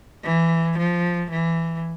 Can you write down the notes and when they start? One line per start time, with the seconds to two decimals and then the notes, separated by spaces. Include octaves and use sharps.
0.24 E3
0.78 F3
1.30 E3